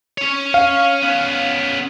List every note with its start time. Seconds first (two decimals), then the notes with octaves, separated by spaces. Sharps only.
0.18 C#4 C#5
0.54 F5
1.03 B3 C#4